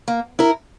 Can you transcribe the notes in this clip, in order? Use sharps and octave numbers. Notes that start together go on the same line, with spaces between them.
A#3
E4 A#4